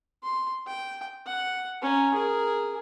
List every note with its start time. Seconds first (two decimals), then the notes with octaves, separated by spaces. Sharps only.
0.23 C6
0.67 G5
1.26 F#5
1.82 C#4 A#5
2.14 G#4 A#4